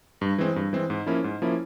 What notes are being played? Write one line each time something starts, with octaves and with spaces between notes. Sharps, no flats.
G2
E3 G#3 C4
G2
E3 G#3 C4
G#2
F3 A#3 C#4 E4
G#2
F3 A#3 C#4 E4